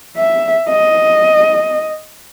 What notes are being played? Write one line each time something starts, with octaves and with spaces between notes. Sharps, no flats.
E5
D#5